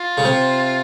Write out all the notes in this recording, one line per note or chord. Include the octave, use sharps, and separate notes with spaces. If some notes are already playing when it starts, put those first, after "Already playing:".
Already playing: F4
C#3
C3